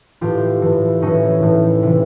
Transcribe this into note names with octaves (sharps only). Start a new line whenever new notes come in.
A2 E3 F4 G4
A2 E3
A2 E3 C#4 D#4
A2 E3
C3 E3